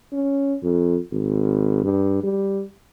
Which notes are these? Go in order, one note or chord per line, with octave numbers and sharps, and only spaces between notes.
C#4
F2
G#1
G2
G3